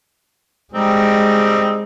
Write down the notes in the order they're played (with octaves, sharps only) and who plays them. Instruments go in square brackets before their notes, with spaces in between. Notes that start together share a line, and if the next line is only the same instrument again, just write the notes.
[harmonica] G3 C4 D#4 [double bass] G#3